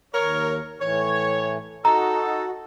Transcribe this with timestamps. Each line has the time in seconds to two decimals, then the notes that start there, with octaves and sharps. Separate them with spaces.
0.14 D#2 A#4 C#5
0.80 A2 E3 C#5
1.85 D#4 F#4 A4 A#5